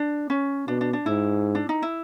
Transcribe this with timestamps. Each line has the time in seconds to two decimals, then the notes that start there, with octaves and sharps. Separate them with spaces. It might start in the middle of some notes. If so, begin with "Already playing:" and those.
Already playing: D4
0.30 C#4
0.67 B2 D4
0.81 D4
0.93 D4
1.06 G#2 E4
1.55 D4
1.69 D#4
1.82 E4